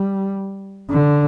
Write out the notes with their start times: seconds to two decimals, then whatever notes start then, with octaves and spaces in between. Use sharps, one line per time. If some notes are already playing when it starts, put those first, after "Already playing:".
Already playing: G3
0.91 D3